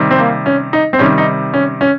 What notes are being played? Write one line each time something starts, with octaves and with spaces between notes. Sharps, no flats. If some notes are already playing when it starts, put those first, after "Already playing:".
Already playing: C3 D#3 G3
C4
A#3
C#4
D#4
C4
C3 D#3 G3 C#4
D#4
C#4
C#4